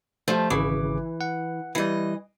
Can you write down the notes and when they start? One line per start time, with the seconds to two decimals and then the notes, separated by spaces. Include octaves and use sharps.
0.28 F3 G3 A3
0.50 G#1 C#3 E3 D6
1.21 F#5
1.75 E3 G3 E4 D#5